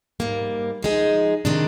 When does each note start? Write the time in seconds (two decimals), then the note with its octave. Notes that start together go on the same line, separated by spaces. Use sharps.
0.20 G#2 G3 A#3
0.82 F3 G#3 D#4 G#4
1.45 C3 D#3 G#3 D4